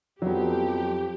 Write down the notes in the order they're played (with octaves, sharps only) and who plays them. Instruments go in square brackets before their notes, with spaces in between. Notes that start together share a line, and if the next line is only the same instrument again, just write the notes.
[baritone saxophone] F2 [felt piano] F#3 B3 [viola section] G4